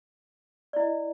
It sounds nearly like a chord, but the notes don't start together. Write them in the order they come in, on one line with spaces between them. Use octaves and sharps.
D5 E4 D#5